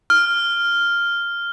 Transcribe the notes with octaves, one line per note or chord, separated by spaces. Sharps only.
F6